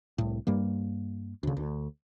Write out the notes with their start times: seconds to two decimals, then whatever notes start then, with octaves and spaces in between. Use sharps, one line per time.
0.18 C2 A2
0.47 G2 G3 A#3
1.43 D2 C#3
1.57 D2